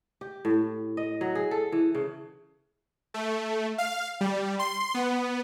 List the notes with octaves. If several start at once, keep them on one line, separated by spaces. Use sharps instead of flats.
G4
A2
D#5
F#3
G#4
A4
E3
C#3
A3
F5
G3
C6
B3